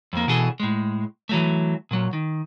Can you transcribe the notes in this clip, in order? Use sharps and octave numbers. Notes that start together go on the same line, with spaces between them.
F2 A#3
B2 E3 G#4 A4
A2 G#3
E3 F#3 A3
A#2 F#3
D#3